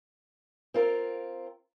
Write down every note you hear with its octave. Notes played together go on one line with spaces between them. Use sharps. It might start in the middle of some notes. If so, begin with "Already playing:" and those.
C4 F4 A#4